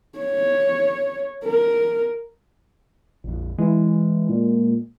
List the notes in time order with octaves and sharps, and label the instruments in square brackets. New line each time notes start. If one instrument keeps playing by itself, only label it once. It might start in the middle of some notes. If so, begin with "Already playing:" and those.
[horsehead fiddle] C#5
A#4
[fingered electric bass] A#1 F2
[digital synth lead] E3 [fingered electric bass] G#3
[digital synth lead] A#2